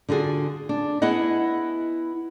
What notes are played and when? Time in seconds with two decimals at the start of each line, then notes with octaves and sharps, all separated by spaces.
0.09 D3 F4 F#4 G#4
0.69 D4
1.02 B3 E4 G#4 D#5 F#5